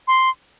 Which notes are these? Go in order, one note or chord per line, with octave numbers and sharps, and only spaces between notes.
C6